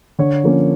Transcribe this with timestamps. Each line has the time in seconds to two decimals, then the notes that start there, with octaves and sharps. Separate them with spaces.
0.19 D3 C#5
0.44 F3 A#3 C#4